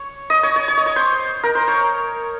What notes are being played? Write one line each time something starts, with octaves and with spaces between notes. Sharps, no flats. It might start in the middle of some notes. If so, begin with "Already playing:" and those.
Already playing: C#5
D#5
C#5
C#5
C#5
D#5
C#5
C5
A#4
C5
C#5